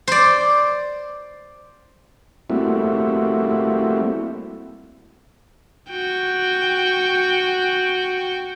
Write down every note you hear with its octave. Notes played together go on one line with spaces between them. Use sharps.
C5 D5
G3 A3 A#3 C4 E4 F#4
F#4 G5